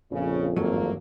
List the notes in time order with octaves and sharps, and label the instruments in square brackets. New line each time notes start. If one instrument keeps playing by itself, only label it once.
[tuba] A#1 [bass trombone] F2 [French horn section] C#3
[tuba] G#1 [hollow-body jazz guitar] E2 G2 F#3 [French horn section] A3 A#3